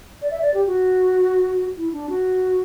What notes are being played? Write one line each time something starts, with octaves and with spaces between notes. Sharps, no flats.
D5
E5
D5
G4
F#4
E4
D4
F#4